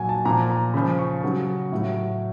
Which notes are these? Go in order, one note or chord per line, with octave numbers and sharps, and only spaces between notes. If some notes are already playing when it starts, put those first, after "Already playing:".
Already playing: A#2 F#3 G#5
A5
A#2 F3 A#5
A#5
C#3 F3 B5
C#6
C#3 F#3
A2 F#3